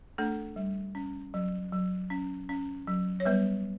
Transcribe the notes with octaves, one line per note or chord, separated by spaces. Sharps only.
A3 D4 A4
G3
C#4
F#3
F#3
C#4
C#4
F#3
C#5
G3 B3 B4